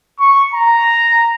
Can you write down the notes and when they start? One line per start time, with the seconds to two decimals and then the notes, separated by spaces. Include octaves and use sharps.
0.19 C#6
0.54 A#5